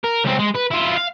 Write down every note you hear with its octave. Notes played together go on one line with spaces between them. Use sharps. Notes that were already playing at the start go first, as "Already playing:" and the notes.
A#4
C#2 C4
G#3
B4
E4 F4
F5